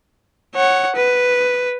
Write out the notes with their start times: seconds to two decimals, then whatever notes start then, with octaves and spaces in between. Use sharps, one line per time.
0.55 C#5 F#5
0.96 B4